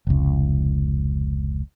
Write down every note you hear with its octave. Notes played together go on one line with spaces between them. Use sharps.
F1 C#2